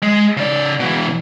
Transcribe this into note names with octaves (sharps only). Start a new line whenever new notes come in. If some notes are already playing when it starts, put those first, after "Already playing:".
G#3
C#3 D5
B2 E3